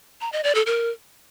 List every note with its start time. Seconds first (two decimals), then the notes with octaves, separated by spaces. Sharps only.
0.21 A#5
0.32 D#5
0.44 D5
0.55 A4
0.66 A#4